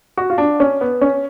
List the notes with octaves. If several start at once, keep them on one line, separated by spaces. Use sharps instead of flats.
F#4
F4
D4
C#4
B3
C#4